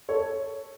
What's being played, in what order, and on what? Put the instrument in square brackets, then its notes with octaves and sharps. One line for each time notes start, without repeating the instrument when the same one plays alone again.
[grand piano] A4 C#5